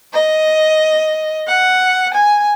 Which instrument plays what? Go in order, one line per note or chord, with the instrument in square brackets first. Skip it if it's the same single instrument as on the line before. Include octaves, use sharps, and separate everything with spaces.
[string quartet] D#5
F#5
G#5